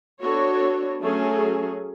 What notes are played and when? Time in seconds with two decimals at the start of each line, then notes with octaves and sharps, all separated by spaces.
0.22 B3 D4 F#4 A4 C#5
1.02 F#3 A3 C#4 G#4